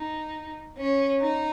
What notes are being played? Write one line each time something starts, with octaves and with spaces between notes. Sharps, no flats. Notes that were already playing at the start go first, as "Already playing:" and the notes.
Already playing: D#4
C#4
D#4